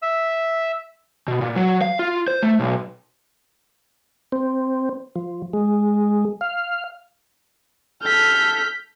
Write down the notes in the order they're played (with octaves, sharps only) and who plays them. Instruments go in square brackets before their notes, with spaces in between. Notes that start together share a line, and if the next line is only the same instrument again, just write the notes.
[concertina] E5 E6
[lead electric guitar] B2
A#2
F#3
F5
F4
C5
A3
B1
[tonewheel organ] C4
F3
G#3
F5
[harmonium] A4 [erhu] F6 [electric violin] G6 B6